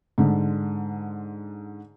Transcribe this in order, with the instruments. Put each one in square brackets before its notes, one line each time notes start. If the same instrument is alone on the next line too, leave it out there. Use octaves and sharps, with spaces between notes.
[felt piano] G#2 D3